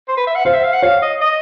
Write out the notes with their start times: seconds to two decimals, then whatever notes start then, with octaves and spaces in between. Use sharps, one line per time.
0.08 C5
0.17 B4
0.27 E5
0.35 F#5
0.45 C5 F5
0.54 E5
0.64 F5
0.73 F#5
0.83 C#5 F5
1.02 D#5
1.21 D#5